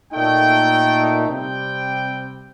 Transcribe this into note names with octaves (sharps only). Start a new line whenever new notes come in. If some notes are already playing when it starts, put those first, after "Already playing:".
A#2 A3 D#4 G5
C3 G3 C4 G5